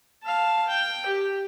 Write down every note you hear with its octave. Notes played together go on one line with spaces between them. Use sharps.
F5 A5
G5
G4